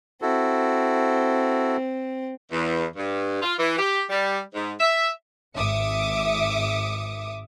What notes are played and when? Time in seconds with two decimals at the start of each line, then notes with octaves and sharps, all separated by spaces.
0.22 C4 E4 F#4 A4
2.52 E2
2.96 G2
3.41 F4
3.59 E3
3.78 G4
4.10 G3
4.54 G#2
4.79 E5
5.55 G#1 E5 D6 D#6 C#7